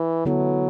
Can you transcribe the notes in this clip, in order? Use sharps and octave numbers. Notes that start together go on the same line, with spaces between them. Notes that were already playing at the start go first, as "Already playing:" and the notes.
Already playing: E3
D3 F#3 B3 E4 A4